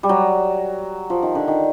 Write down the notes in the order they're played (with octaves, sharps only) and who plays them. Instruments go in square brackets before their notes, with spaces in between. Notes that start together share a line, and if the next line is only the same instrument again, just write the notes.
[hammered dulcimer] G3
F#3
F3
D#3
D3
D#3